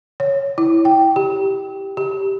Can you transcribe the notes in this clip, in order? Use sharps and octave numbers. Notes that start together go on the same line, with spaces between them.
C#5
E4
G5
G4
G4